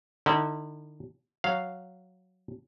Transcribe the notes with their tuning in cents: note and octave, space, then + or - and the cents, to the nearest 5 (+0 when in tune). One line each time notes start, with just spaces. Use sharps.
D3 +45 E4 -40
F#3 +0 F5 -5